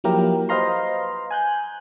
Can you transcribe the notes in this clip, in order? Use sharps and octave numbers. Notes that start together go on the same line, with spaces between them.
F3 F#3 A#3 E4 G4 A#4
B4 C5 D#5 F5 A#5 C6
G#5 F#6 G6